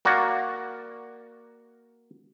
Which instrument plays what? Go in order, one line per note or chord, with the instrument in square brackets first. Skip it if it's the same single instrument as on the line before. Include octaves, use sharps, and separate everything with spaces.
[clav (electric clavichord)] A#3 F#4 D5